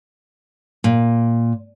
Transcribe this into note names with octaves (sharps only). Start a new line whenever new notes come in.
A#2